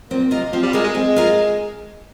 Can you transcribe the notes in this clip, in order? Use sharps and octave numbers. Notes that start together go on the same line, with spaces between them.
A#2 C4
C3 F4 A#4 D#5
F3 C4
G3
G#3 F4 A#4 D#5
G#3
G#3 C4
F4 A#4 D#5